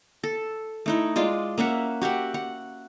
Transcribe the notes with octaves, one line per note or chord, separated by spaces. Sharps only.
A4
A3 D#4 E4
G#3 F4 D5
A#3 C#4 E5 F#5
F#4 G4 E5 F#5
F#5